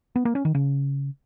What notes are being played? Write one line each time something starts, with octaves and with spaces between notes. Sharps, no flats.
B3
A#3
C#4
D#3
C#3